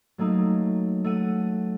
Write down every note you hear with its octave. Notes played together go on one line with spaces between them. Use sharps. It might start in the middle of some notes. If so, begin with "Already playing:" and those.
F#3 A3 A#3 D#4
A3 F#5 D#7